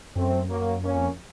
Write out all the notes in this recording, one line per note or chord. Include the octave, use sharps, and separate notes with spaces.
F#2 A3 C4
F#3 A#3
A#3 C#4
F2